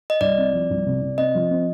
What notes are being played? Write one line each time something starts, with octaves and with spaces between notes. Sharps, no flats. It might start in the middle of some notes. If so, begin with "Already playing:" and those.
D#5
C2 D5
C4
F3
C2
C3
C3
C4 D#5
F3
C4